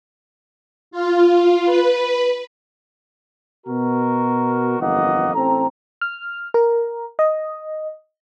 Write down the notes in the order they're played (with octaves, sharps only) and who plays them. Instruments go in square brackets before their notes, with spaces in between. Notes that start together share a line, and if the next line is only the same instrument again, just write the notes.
[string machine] F4
B4
[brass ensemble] B2 F#4 A#4
G1 F2 E3 A#3 D#5 F#5
A1 C4 A4 A#5
[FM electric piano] F6
A#4
D#5